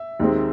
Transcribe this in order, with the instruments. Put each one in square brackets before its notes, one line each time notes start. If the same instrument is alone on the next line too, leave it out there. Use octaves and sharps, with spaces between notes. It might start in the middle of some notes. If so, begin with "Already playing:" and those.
Already playing: [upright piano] E5
D#2 D#3 G#3 C4